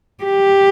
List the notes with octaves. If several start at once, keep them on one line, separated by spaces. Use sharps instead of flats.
G4